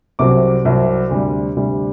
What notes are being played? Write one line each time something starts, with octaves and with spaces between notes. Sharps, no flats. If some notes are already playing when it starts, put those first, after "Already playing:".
C2 C3 F#3 C4 D6
C2 C3 F#3 C4
D2 C3 G3
D2 C3 G3